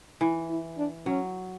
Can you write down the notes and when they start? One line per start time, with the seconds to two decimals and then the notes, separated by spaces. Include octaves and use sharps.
0.21 E3 E4
0.50 E4
0.78 D4
1.06 F#3 C#4